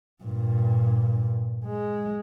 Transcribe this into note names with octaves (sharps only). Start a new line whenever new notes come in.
G2 A#2
G#3